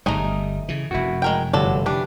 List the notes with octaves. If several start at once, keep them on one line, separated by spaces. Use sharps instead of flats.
G1 C#2 G3 A3 D#4 G#4 D#5 A#5
C#3 E3
F1 F#2 E4 F#4
G#3 A#4 G5
G1 F#3 A4 D5
E3 D4 G4